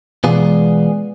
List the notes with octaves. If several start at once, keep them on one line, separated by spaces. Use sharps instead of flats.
B2 E3 G#3 B3 F4 G#4 D5